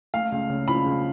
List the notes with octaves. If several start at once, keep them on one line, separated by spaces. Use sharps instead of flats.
A3 F5
C#2
C#3
F3 B5
C#2